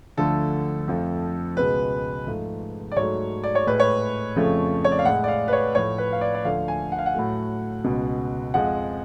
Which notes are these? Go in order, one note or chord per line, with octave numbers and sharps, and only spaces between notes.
D2 D3 F3 A3 A4
F2 F3 A3
C#2 B2 G#3 B4
G#2 F3 A3
D5
G#2 F#3 A3 C#5
D5
C#5
A2 G#3 B4
C#5
F2 C#3 F3 A3
C#5
D5
F5
A2 G#3 F#5
D5
F5
B4
C#5
A2 F3 A3 C#5
B4
F5
D5
D5
D2 D3 F3 A3 F5
G#5
F#5
F5
F#5
A2 F#3 A3
C#2 B2 G#3
F2 F3 G#3 F#5